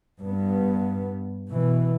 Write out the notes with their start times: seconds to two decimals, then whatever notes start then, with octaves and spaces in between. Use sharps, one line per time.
0.20 G2 B3
1.48 B2 E3